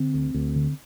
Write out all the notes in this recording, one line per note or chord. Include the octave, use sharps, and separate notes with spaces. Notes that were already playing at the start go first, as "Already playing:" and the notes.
Already playing: D3 C4
D2
D2
D3